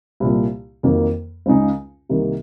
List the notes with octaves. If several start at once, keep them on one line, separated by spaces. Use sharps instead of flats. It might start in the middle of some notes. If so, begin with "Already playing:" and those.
C2 A#2 F3
F2 D#3 F#3 A#3
C#2 C#3 G#3 D#4
C2 C3 D#3 A#3